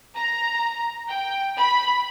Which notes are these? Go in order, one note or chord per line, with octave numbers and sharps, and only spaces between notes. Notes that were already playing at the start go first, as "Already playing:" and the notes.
A#5
G5
B5